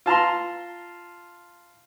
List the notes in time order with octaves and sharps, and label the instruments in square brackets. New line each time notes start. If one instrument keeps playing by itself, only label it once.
[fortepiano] F4 A5 A#5 C6